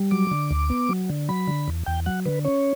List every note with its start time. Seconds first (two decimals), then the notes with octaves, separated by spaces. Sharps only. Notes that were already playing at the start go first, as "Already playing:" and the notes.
Already playing: G3
0.11 F#3 D6
0.31 D3
0.51 D2
0.70 B3
0.89 F#3
1.10 D3
1.29 F#3 B5
1.47 D3
1.68 E2
1.86 E2 G5
2.06 F#3 F#5
2.26 D3 B4
2.45 C#4 C#5